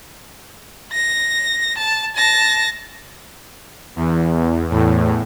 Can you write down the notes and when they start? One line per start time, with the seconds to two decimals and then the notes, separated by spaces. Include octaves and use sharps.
0.93 A#6
1.78 A5
2.16 A5 A#6
3.96 E2
4.70 E2 A2